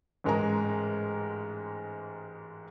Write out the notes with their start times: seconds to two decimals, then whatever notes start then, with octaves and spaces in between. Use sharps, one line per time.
0.24 A1 G#2 G#3 A#4 G#5 A#5